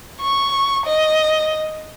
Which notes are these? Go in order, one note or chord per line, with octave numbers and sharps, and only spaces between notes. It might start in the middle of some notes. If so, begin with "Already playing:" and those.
C#6
D#5